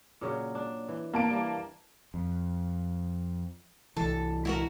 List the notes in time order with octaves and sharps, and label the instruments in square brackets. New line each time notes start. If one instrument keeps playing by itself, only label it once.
[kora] A#2 C#3 F#3
D4
E3
[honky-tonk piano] A#3 A5 D7
[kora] E3 G3
[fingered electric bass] F2
[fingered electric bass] C2 E3 [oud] A4
[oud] E4 F#4 A#4